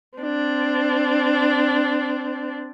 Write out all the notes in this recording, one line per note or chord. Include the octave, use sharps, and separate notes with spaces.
C4 D4